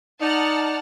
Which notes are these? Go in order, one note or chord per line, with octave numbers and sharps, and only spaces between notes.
D#4 D5 F#5 A5 F6